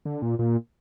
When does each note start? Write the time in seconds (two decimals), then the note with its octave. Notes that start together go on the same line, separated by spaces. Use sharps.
0.05 D3
0.22 A#2
0.39 A#2